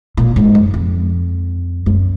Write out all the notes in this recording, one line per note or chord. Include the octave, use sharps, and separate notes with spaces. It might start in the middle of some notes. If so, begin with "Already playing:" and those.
A#2
G#2
F#2
F2
F#2